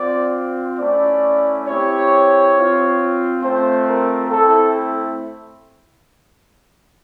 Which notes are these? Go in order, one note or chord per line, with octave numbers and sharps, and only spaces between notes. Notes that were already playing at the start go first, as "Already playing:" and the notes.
Already playing: C4 F4 D5
A3 C#4 E4 D5
C4 E4 G4 C#5
C4 F4
A3 C4 F4 C5
A#4
A3 C4 E4 A4